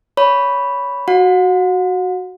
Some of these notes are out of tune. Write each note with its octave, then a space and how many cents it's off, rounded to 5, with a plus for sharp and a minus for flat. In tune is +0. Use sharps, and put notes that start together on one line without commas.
C#5 +20 B5 +0
F#4 +0 F#5 -40